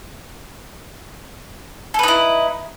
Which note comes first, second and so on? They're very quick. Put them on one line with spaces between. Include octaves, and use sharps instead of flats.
A4 B4 D#4 E4